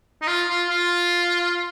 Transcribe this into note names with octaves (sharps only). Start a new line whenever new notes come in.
D#4
F4
F4
F4